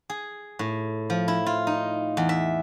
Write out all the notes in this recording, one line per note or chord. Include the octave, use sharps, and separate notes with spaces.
G#4
A2
F3
E4
F4
D#4
E2
E5